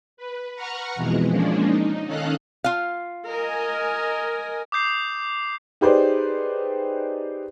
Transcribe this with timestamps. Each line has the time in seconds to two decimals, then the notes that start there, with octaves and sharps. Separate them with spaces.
0.17 B4
0.55 B4 F#5 A#5 C#6 F6
0.95 F2 B2 E3 G#3
1.29 F3 G#3 A#3 C#4 D4
1.64 D#4
2.05 D#3 C#4 A4 D#5 F5 F#6
2.64 F4 F5
3.29 A#4 D#5 G#5
4.72 D6 D#6 G6 C7
5.81 D#4 G4 G#4 B4 C5 D5